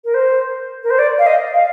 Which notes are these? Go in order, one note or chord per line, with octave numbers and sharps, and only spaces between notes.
A#4
C5
A#4
C5
D5
F5
D#5
F5